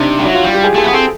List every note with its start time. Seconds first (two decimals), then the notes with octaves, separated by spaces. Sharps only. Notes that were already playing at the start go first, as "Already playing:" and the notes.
Already playing: C3 D4 D#4
0.19 G3
0.24 F#3 E4
0.34 F4
0.44 G3
0.54 G4
0.64 G#4
0.74 A3 G#4
0.84 B3
0.91 C4 A4